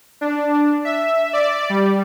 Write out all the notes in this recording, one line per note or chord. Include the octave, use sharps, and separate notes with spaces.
D4
E5
D5
G3